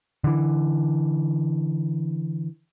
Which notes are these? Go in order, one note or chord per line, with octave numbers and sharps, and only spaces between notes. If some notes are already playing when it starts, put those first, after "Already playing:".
D3 E3